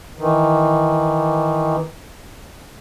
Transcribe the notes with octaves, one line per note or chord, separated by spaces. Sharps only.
D#3 E3